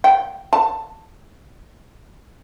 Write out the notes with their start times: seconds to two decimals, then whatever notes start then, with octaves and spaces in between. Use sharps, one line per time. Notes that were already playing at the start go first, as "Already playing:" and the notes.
0.04 G5
0.53 A5